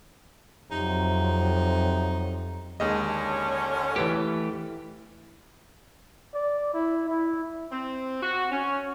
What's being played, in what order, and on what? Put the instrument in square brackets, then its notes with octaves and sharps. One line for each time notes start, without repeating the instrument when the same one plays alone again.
[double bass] F2 [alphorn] C3 [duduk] F#3 [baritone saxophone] D#4
[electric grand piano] D#2 D#5 [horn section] D3 C#4 [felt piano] G#3
[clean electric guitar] E3 A3 G4 [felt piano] B4
[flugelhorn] D5
E4
E4
[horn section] C4
F#4
C#4